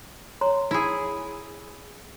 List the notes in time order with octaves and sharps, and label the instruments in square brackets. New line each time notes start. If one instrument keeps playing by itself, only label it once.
[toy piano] C#5 A#5 C6
[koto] E4 G#4